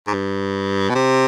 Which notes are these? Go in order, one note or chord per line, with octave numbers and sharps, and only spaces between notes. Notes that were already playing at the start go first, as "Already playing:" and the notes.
G#2
G2
B2
C3